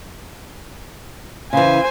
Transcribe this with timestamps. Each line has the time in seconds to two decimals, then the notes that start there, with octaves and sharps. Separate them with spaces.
1.53 C#3 E3 C5 G#5